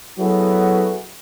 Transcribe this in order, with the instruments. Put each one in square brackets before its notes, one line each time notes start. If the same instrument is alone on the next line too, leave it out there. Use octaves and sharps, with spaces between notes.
[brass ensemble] F#3 B3 E4 F#4 G#4 A4